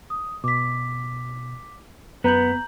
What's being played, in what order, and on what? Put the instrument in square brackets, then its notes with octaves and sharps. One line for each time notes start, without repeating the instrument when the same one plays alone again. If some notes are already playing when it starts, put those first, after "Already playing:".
[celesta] D#6
[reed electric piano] B2 [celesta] D6 B6
[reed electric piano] F#2 B4 [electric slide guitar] B3 [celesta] A#5 G6 F#7